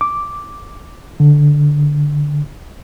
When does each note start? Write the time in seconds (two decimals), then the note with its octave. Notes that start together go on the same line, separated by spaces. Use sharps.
0.01 D6
1.20 D3